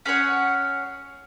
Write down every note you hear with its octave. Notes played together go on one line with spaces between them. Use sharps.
C#4 G#4 C#5 F#5